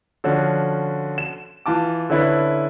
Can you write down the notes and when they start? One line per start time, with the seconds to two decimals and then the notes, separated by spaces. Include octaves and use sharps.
0.24 D3 F3 C#4 F#4
1.18 E7
1.66 E3 F4 A5 D6
2.10 D3 C#4 E4 B4